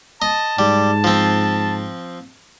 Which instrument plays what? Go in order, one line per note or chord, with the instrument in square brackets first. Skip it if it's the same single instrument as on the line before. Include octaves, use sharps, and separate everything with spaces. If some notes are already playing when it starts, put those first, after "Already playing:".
[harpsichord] D#5 [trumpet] A5
[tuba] G#2 [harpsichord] G3
[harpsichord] F3 C4